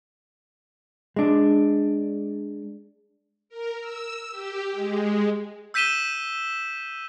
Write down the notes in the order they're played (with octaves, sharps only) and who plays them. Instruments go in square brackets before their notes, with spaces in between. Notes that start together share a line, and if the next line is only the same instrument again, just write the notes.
[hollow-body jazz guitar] G#3 D4
[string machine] A#4
E6
G4
G#3
[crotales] E6 G6 B6 D#7 E7 G7